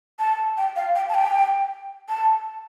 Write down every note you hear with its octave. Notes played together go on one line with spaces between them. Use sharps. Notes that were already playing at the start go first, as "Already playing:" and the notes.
A5
G5
F5
G5
A5
G5
A5